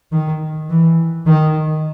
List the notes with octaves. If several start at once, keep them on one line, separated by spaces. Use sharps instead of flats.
D#3
E3
D#3